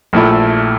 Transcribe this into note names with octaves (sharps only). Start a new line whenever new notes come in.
A#1 A#2 A3 E4